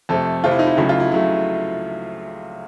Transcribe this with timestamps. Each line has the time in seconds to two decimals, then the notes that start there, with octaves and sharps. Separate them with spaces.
0.09 F2 C3 F3 A3 A4
0.43 F2 C3 F3 A3 F4
0.51 E4
0.59 D#4
0.66 E4
0.77 C#2 C#3 F#3 A3 E4
0.89 F4
1.00 E4
1.12 C#3 F#3 A3 E4